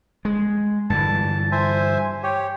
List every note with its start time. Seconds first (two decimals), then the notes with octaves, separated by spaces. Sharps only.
0.25 G#3
0.90 G2 D3 E3 A5
1.52 C5 E5 G#5
2.23 G4 C#5